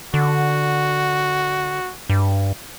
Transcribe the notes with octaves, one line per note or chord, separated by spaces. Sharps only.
D3 F#4
G2